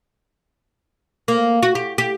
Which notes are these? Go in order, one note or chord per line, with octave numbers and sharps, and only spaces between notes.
A#3
F#4
G4
G4